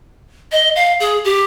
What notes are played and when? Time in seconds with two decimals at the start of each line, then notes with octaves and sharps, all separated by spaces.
0.52 D#5
0.76 F5
1.00 G#4
1.24 G4